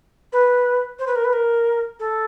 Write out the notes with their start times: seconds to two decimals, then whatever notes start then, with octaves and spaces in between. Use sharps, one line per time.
0.33 B4
0.99 C5
1.07 B4
1.16 A#4
1.24 B4
1.33 A#4
2.00 A4